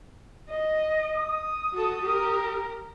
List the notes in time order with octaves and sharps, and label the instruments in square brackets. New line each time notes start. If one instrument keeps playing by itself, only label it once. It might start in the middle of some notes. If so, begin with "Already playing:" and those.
[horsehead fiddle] D#5
[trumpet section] D#6
[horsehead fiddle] F#4 A4
G4 A#4